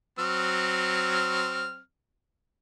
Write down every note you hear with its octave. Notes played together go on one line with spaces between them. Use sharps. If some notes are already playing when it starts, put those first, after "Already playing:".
F#3 C4 F6